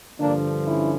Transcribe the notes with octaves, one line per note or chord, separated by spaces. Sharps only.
G2 D3 F3 A#3 D4
C#4 E4